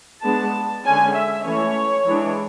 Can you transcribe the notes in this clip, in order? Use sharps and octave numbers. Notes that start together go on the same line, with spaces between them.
G#3 B3 D4 A5
D3 G#3 C#4 G#5
E5
E3 A3 C#4 C#5
E3 G#3 D4